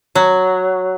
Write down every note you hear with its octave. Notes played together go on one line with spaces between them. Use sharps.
F#3